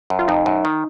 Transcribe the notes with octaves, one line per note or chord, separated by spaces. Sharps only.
F#2
F4
F2 D#4
F#2
D#3